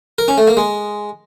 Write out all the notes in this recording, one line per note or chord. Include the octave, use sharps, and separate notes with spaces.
A#4
C#4
A3
A#3
G#3